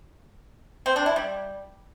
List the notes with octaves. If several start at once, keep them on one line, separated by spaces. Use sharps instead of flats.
C4
D4
E4
G3